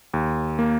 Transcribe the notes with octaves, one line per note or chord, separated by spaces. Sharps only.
D#2
A#3